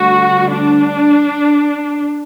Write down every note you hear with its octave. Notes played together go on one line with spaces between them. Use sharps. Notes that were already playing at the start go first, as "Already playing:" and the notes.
Already playing: D2 D3 G3 F#4
D4